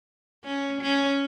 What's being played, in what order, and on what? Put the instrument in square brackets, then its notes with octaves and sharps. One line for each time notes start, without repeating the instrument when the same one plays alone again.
[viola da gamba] C#4
C#4